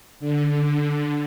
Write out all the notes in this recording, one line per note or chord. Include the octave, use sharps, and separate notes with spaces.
D3